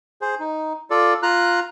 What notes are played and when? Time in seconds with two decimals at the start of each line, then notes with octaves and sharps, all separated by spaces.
0.21 G#4 C5
0.39 D#4
0.90 F4 A4 D5
1.23 F4 A#5 F#6